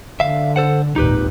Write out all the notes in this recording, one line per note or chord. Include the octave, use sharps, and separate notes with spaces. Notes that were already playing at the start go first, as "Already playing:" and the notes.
D3 E5 F5
A4 C5 F#5
G#1 D#2 A#2 D#4 G4 B4